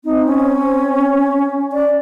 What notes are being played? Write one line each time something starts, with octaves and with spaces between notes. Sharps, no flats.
C4 D#4
C#4
D5